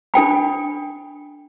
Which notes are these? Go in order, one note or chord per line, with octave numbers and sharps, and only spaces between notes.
D4 A4 G5 B5